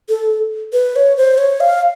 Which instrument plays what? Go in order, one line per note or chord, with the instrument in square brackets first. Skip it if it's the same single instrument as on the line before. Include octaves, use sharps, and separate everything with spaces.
[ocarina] A4
B4
C#5
C5
C#5
F5